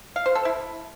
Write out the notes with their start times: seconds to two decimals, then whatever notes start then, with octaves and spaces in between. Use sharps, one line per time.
0.16 F5
0.26 C5
0.35 A4
0.45 E4